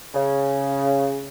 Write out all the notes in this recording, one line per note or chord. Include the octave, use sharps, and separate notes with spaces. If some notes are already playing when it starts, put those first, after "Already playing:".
C#3